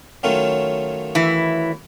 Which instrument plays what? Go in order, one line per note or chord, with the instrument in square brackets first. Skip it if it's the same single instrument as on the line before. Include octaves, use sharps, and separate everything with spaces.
[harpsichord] D#3 F#3 A3 C#4 F4
[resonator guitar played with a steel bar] E3 E4